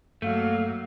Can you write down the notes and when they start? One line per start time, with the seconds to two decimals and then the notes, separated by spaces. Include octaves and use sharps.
0.22 G2 F#3 A3 A#3 F5